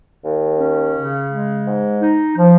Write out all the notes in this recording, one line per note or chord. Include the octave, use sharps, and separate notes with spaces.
D#2
C#4
C#3
G#3
G#2
D#4
F3